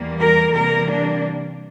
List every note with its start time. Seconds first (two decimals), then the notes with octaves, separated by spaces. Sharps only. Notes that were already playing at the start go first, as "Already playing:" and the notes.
Already playing: E2 E3 G3 A#3
0.20 A#4
0.55 C3 E3 G3 A#3 A#4
0.90 D4